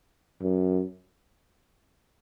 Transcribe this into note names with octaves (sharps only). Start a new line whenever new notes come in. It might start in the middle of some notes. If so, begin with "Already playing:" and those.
F#2